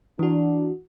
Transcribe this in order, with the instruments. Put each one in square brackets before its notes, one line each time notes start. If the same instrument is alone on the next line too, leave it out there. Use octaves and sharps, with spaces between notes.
[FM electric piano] E3 F#4 [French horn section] D4